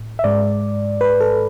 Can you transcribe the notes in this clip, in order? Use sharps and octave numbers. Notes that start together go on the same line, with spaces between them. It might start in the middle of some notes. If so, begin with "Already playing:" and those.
Already playing: A2
E5
G#2 G#3 D5
B4
A4